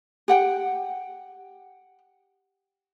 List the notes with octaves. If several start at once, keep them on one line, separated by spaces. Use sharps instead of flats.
G4 F#5 G5